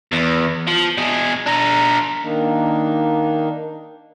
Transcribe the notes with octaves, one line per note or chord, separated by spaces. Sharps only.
E2
F3
B2 G#4
D4 A#4
D#3 A#3 D4 D#4